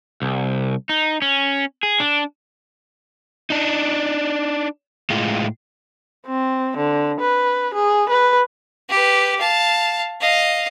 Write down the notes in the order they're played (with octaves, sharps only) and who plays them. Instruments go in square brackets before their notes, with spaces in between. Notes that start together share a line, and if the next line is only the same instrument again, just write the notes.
[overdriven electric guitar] C2
D#4
C#4
G#4
D4
[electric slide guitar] D4 D#4
A2 G#3 F4
[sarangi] C4
D3
B4
G#4
B4
[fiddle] G4 B4
F5 A5
D#5 F5